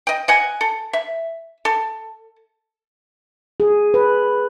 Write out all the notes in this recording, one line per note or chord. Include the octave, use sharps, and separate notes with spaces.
D#5 G5
D#5 F#5 G#5
A4
E5
A4
G#4
B4